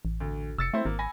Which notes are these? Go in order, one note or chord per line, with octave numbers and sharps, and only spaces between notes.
A1
D2
F1 E6 A6 C#7
A3 C4 E4 C5
G#1 A#3
G#5 B5 A#6